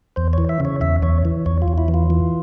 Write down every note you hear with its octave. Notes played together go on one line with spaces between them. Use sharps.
E2 C5
E3 C#5
E5
C#3 C#5
E2 E5
E2 C#5
E3
E2 C#5
F4
E2
E4
E3
F4
E3